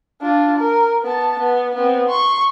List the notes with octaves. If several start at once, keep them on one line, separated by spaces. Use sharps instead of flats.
D4 F4
A#4
B3 A5
B3
B3 C4
C6 C#6